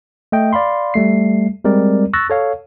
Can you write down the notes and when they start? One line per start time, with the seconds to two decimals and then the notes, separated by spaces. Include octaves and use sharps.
0.32 A3 D#5 G5
0.53 D5 F5 B5 C6
0.94 G3 A3 C7
1.65 G3 G#3 C4 A#4 D5
2.13 C#6 E6 F#6 A6 A#6
2.30 A4 C#5 F5